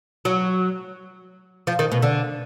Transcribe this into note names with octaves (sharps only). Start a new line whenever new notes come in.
F#3
F3
D#3
B2
D3